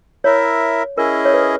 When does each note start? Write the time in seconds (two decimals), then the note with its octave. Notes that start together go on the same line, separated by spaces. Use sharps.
0.24 E4 A#4 C#5 E5
0.98 C#4 E4 G#4 A#4 D#5
1.25 C#5
1.34 B4